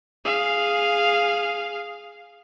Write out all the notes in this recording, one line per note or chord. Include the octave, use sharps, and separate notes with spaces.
G#4 F5